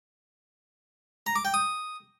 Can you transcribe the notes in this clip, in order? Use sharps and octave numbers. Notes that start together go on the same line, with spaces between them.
A#5
D6
G5
D#6